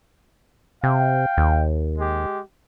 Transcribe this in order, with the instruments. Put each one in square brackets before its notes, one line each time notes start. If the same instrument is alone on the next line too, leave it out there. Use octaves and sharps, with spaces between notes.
[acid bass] C3 [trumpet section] F5 G5
[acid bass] D#2
[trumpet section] G#3 G4